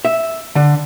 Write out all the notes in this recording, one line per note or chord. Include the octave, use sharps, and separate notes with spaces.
E5
D3